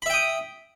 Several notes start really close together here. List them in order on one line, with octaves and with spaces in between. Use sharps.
B5 E5 G5 D#6